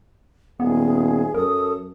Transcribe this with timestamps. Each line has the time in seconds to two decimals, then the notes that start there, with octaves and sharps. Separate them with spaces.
0.60 D#1 B3 G#4
1.34 F#2 A4 A#4 D#6